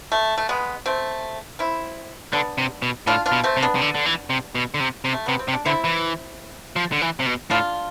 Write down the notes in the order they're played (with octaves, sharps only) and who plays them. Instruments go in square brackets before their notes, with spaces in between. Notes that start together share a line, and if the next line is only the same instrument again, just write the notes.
[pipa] A3
A3
G#3 B3
A3 C4
C4 E4
[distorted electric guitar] D3 [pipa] B3 D4
[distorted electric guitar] C3
B2
[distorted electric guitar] A2 [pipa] D4 F4
[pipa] D4 F4
[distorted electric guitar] B2
[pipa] A3 C4
[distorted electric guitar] C3
[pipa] B3 D4
[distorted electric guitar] C3
D3
D3
E3
C3
B2
D3
C3
C3
[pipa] A3
[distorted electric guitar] C3 [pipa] B3
[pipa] C4
[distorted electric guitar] C3
[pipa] D4
[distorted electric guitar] D3 [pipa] C4 E4
[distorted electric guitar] E3
F3
D3
E3
C3
B2
[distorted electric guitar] A2 [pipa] D4 F4